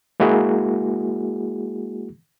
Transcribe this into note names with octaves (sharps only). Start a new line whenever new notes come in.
G#3 A#3 E4 F#4 G#4